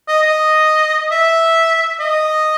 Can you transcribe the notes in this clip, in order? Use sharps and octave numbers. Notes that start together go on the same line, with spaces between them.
D#5
D#5
E5
D#5